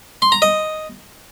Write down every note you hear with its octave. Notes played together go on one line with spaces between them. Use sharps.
C6
A#5
D#5